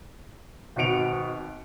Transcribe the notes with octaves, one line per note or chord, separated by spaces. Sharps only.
G#1 B2 B3 C#7 D7 F7